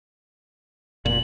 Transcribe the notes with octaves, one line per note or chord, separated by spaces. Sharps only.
F1 A#2 F#7